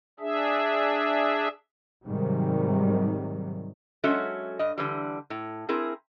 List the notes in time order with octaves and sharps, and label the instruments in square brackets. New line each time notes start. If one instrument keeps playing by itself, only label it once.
[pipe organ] D4 G#4 E5
[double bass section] G#2 C3 D#3 F#3 G3
[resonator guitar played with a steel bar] F#3 G#3 C#4 F#4 A4 E5
G2 D#5
D3 E3 G3
A2
C4 E4 G#4 A#4